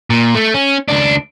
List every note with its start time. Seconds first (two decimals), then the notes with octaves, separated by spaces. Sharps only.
0.10 A#2
0.35 A3
0.54 C#4
0.88 C#2 D4